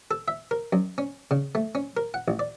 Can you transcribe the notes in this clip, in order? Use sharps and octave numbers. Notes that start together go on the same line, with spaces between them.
A4
E5
A#4
F#2
C#4
C#3
A3
C#4
A#4
F#5
A1
D5